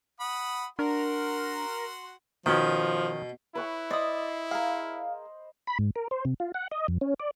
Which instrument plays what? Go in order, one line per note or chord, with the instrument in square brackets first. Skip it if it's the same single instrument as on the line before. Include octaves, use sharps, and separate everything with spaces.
[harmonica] F#5 B5 D#6
[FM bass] D4 [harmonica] F#4 F#5 C6 [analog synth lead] A#4
[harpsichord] B2 [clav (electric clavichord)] D#3 C#4 [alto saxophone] F3
[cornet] E4 [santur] B4 C#5 G#5
[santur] C5 D#5 B5 [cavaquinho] D5 D#6
[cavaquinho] G#4 A#4 [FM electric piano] F5
[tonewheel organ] B5
G#2
A#4
C5
C3
F4
F#5
D#5
F2
C#4
D5